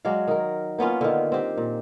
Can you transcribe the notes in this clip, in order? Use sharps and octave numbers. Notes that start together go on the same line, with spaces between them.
F#3 G#3 D5 F5
D#3 A#4
A#3 B3 C#4 F4
D3 D#3
C4 G4
A#2